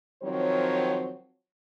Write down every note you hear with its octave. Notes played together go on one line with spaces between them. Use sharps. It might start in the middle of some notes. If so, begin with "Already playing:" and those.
D#3 F3 F#3 C4 C#5